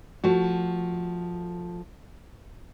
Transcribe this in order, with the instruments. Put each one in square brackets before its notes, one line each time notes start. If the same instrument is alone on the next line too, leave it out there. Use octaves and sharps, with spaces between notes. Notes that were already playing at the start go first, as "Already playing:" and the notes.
[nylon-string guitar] F3 A3 F#4